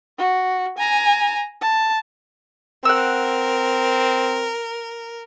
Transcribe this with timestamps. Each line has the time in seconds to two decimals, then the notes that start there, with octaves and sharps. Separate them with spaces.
0.18 F#4
0.78 G#5 A#5
1.61 A5
2.85 C4 A#4 F#5 E6